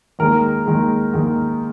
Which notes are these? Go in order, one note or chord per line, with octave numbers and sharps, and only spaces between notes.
D#2 D#3 G#3 A#4
D#2 D#3 G#3
D#2 D#3 G#3